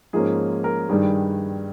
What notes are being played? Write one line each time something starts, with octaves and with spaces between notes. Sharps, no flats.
G#2 F3 A#3 C#4 G#4
A#4
G2 D#3 G3 G#4